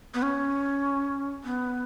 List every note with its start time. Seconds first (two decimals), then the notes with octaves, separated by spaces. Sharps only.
0.14 B3
0.22 C#4
1.44 B3